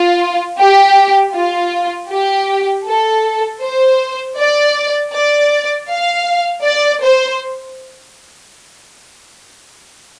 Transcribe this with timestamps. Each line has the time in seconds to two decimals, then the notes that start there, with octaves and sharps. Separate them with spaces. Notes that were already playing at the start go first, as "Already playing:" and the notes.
Already playing: F4
0.59 G4
1.34 F4
2.11 G4
2.86 A4
3.61 C5
4.37 D5
5.13 D5
5.88 F5
6.64 D5
7.02 C5